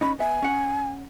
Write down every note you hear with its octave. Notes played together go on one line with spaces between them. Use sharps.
C#4 D#4 B5
B3 E5 G#5
C#4 F#5